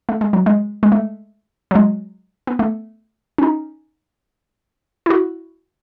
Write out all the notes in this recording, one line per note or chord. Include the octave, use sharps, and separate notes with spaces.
A3
G#3
F#3
G#3
G#3
A3
F#3
G#3
B3
A3
C#4
D#4
E4
F#4